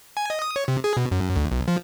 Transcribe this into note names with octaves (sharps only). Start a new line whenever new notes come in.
G#5
D#5
D#6
C#5
C3
G#4
B2
F#2
D2
B1
F3